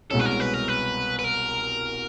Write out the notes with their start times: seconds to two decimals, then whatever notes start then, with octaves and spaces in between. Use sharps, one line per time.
0.11 C2 B2 G#3 C#4 A4
0.20 B4
0.25 A#4
0.40 B4
0.54 A#4
0.68 B4
1.19 B4
1.24 A#4